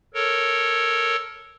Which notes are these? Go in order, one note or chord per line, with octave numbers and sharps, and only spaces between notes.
A4 A#4 C#5